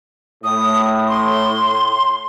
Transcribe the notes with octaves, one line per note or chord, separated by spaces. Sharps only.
A2 D#6
C6